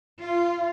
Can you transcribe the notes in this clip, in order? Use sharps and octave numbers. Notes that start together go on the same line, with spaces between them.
F4